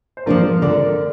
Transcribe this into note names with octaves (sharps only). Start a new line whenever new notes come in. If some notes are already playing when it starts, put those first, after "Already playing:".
C5
F3 A#3 D4 F4 A#4
D3 A#4 D5